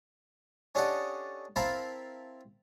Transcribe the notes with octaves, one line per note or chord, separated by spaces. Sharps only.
C#4 D4 G4 A4 D#5 F#5
C4 E4 A#4 F5 A5 B5